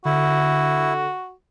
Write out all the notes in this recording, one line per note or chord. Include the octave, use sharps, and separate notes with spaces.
D3 E4 F#4